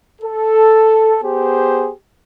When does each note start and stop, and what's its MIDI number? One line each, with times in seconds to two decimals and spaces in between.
0.22 1.16 69
1.22 1.91 59
1.22 1.91 67
1.22 1.91 68
1.22 1.91 72